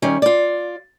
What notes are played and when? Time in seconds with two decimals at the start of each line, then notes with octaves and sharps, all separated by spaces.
0.02 D#3 G3 C#4
0.22 F4 D5